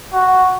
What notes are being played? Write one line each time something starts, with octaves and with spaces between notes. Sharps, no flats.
F#4